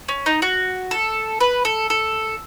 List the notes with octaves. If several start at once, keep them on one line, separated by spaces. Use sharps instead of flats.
C#4
D#4
F#4
A4
B4
A4
A4